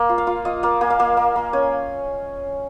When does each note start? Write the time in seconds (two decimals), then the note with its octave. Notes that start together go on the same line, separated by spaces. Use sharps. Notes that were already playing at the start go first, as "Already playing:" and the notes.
Already playing: A#3
0.09 F4
0.18 F5
0.27 F4
0.45 F4 D#5
0.63 A#3 F5
0.81 A#3 G#5
0.90 F5
1.00 A#3 G#5
1.17 A#3
1.36 A#3
1.53 C#4 G#5